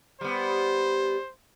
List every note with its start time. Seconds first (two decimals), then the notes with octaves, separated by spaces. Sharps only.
0.21 G3 B3 C5